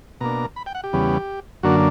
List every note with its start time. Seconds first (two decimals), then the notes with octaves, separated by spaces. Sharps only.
0.21 B2 A#3 D4 A#5
0.56 B5
0.66 G5
0.75 F#5
0.84 G4
0.93 E2 C#3 G3 B3
1.63 F#2 D3 A#3 D4 F#4